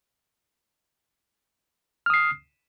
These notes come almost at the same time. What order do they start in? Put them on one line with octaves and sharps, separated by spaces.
F6 D#6 C7